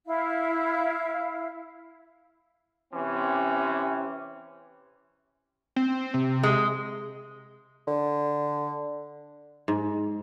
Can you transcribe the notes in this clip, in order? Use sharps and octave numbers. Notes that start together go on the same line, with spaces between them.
E4 F5
C3 E3 C4 C#4
C4
C3
G#3
D3
G#2